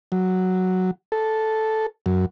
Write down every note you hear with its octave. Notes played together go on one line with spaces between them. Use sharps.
F#3
A4
F#2